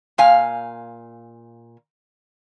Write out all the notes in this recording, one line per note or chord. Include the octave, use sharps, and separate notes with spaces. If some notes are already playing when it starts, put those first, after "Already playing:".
A#2 F5 G#5